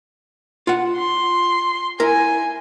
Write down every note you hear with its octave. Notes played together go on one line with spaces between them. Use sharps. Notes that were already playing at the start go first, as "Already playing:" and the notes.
F4 F#5
C6
E4 A#4 G#5